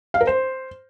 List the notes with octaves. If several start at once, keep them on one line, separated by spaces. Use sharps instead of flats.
F5
A#4
C5